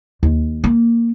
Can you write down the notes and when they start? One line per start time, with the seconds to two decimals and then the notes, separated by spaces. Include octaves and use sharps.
0.23 D#2
0.64 A#3